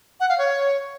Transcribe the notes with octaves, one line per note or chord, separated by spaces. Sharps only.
F#5
F5
C#5